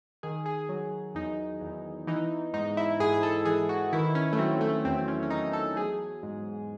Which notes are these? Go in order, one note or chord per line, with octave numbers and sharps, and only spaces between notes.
D#3 G#4
G#4
F#3
E2 D#4
E2
E3 D#4
G#2 D#4
E4
G#2 G#4
G#4
A4
E3 G#4
F#4
D#3 E4
C#4
A3
F#3 C4
A3
E2 C4
C#4
C#4
E2 D#4
A4
F#3 G#4
G#2